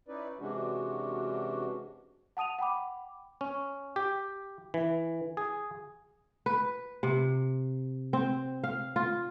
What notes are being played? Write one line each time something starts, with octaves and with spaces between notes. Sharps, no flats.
C#4 D#4 E4 B4 D5
C3 E3 G#3 C#4 D4 F#4
F#5 A5 D#6 D#7 F7
F#5 G5 B5 D6
C#4
G4
E3
G#4
B4
C3
C4
F5
F4